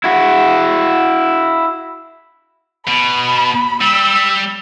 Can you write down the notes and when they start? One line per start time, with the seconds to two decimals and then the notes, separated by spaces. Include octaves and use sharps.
0.04 E4 F#4
2.88 B2 B5
3.81 G3 E6